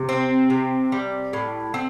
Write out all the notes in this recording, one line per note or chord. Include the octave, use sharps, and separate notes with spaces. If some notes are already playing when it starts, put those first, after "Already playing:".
Already playing: C3
C4
C3
G3
A2
C4